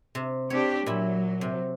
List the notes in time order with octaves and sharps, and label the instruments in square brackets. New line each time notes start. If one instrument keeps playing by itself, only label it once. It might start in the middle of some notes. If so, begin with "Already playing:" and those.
[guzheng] C3
[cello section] C4 D4 G4 [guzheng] C#5
[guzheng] A#2 E4 [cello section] F#3
[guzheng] C3